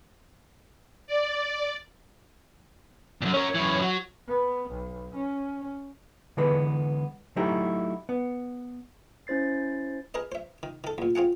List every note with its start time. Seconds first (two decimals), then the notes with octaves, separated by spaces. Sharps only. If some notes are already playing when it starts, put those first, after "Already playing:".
1.07 D5
3.22 F#2 A#2
3.34 C#4 A#4 C#5
3.55 F#2 E3
3.81 F#3
4.28 B3
4.70 B1
5.15 C#4
6.37 D3 E3 G#3 B3 B4
7.36 F#3 A3 D#4 E4 G4
8.09 B3
9.27 C#4 E4 C5 A6 C7
10.14 G#4 A#4 B4 D#5
10.32 C5 E5
10.63 D#3
10.84 D#3 A4
10.98 E2 A#2
11.15 C4 F4 G#4 F#5